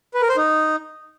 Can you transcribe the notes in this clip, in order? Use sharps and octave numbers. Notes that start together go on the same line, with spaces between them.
B4
A#4
C5
D#4